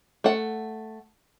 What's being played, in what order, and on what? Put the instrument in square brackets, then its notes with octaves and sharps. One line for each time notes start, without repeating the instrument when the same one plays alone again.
[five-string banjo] A3 F#5